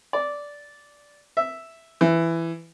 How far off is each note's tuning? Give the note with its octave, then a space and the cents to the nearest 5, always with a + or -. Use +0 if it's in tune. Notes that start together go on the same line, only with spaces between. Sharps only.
D5 -10
E5 +0
E3 +10